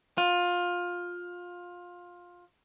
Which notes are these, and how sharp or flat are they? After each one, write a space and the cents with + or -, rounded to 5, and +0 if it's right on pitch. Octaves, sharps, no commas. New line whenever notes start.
F4 +20